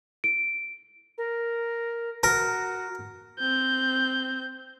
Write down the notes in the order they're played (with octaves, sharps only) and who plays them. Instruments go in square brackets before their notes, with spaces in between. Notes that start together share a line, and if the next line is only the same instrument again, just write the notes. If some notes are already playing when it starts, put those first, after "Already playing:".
[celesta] D7
[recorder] A#4
[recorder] F#4 [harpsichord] A#4
[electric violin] C4 G6